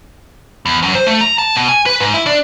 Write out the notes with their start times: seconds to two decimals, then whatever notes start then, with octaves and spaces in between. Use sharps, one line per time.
0.66 E2
0.83 F#2
0.95 C5
1.07 A3
1.21 A#5
1.39 A5
1.55 B2
1.68 G#5
1.86 B4
2.00 G#2
2.14 E4
2.26 D4